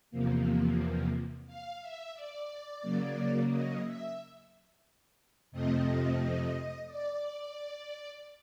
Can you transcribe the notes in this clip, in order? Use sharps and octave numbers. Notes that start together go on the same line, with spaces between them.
E2 C3 F3 A#3
F5
E5
D5
C#3 F#3 A#3
D#5
E5
F2 C3 F3 A3 C4 D#5
D5